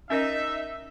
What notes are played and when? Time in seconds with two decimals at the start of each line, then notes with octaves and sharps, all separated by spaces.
0.10 C#4 D#4 A#4 D#5 E5